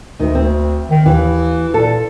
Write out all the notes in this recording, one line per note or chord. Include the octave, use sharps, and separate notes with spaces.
D2 D#3
C4
D#3
D#2 E3
A#2 A4